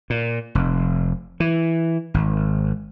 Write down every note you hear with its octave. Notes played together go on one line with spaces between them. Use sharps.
A#2
F1
E3
G#1